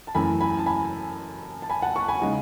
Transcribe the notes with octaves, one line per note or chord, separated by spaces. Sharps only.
A5
F#2 E3 A3 G#5 B5
G#5 B5
A5
G#5 B5
A5
G#5 B5
F#5 A5
A5 C#6
G#5 B5
C#3 G#3 D#4